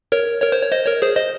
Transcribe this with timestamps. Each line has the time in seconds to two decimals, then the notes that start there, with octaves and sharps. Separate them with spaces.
0.12 A#4 C#5
0.42 A#4 C#5
0.52 C5
0.62 C#5
0.72 C5 D#5
0.87 A#4 C#5
1.02 G#4 C5
1.16 C5 D#5